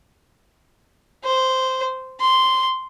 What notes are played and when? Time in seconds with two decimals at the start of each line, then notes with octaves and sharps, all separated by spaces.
1.25 C5
2.21 C6